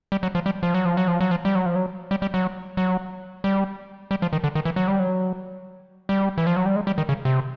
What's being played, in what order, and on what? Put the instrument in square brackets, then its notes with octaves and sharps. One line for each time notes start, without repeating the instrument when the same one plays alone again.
[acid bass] G3
F#3
F3
G3
F3
F#3
F3
F#3
F3
F#3
F3
G3
F#3
F3
F#3
G3
G3
F#3
F#3
G3
G3
F3
D#3
D3
D#3
E3
F#3
G3
F#3
G3
E3
F3
F#3
G3
G#3
G3
D#3
C#3
C3